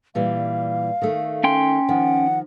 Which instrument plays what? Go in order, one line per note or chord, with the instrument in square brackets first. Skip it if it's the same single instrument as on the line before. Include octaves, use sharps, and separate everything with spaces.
[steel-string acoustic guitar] A#2 E3 G3 [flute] F5
[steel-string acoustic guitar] D#3 A3
[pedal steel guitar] C#4 G5 C6
[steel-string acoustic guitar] D#3 F3 [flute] F#5